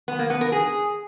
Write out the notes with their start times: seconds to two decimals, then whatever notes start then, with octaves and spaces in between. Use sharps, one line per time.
0.08 B3
0.19 A#3
0.30 B3
0.41 A#4
0.52 G#4